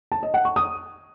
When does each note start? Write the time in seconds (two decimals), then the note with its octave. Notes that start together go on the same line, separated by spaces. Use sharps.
0.12 A5
0.23 D#5
0.34 F#5
0.45 C#6
0.56 D#6